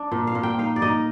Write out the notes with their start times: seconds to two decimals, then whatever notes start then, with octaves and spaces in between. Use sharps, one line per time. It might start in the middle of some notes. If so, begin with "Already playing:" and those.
Already playing: D4
0.12 A#2
0.27 F5
0.35 A#2
0.43 G5
0.59 D#4 F5
0.76 D5
0.82 D#4 D#5